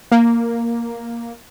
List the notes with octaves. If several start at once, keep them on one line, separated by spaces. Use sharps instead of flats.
A#3